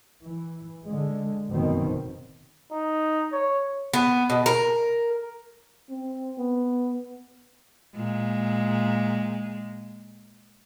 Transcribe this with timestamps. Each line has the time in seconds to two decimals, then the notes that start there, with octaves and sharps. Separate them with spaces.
0.25 E3
0.87 D3 G#3
1.49 F1 F#2 B2 D3 D#3 C4
2.72 D#4
3.32 C#5
3.94 B3
4.30 B2
4.46 A#4
5.90 C4
6.38 B3
7.96 A#2 G#3